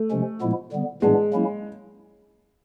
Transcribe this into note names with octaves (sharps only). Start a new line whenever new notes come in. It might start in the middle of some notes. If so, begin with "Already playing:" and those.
Already playing: A3
C3 F3 G#3 C#4
A#2 F3 G#3 B3 E4
D3 G3 B3
A2 E3 G3 G#3 B3 D4
F#3 A#3 C#4 E4